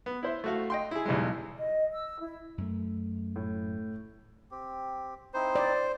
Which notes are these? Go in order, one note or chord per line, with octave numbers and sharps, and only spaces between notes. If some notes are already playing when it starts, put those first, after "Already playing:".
B3
E4 C5 E5
A3 F#4 F5
D#5 G5 C6
E4 G#4
B1 E2 G3 G#3
D#5
E6
E4
F#2 A3
A2
C4 G4
C4 D#4 E4 C5
D5